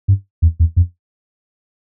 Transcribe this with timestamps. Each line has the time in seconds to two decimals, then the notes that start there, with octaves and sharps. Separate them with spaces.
0.08 G2
0.42 E2
0.60 E2
0.76 F2